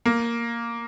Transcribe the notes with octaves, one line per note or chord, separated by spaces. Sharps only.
A#3